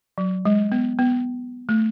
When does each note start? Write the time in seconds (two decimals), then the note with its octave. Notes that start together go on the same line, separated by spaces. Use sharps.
0.18 F#3
0.45 G#3
0.72 B3
0.99 B3
1.69 A3